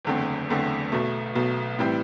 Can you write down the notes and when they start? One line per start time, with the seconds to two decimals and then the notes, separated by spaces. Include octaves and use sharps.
0.05 F#1 E2 D3 A3 C4
0.49 F#1 E2 D3 A3 C4
0.92 B1 B2 A3
1.35 B1 B2 A3
1.79 A2 E3 G3 C4